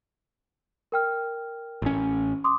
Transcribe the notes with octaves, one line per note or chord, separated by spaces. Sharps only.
A#4 G5 F6
A1 C#4
C6 D6 D#6